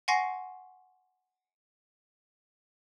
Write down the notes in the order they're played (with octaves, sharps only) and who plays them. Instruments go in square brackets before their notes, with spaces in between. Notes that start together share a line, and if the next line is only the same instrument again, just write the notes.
[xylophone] F#5 G#5 C6 C#6 A#6 C7